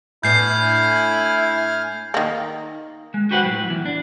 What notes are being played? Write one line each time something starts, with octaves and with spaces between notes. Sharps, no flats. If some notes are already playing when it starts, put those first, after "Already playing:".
A2 B3 D4 E4 G#5 F6 G6 C7
D#3 A#3
G#3
F#4 G4 B4 C5 F#5
A2 F#3
E2 E3
D4